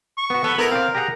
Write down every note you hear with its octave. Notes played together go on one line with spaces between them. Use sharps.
C#6
B3 F#4
B3 A4
B3 E4 A#4
C4 D5 F5
G4 G#4 F#5 A#5